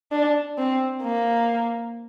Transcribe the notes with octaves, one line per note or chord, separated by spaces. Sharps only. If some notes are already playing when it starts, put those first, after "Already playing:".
D4
C4
A#3